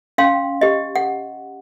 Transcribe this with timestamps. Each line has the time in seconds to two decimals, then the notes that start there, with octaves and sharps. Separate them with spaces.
0.18 C#4 F5 G5 C6
0.61 G4 D#5
0.96 F#5